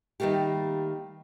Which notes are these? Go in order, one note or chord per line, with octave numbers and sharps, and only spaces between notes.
D#3 G3 A3 A#3 G4